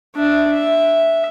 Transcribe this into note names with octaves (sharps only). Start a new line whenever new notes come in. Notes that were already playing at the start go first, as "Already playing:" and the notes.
D4 E5
E5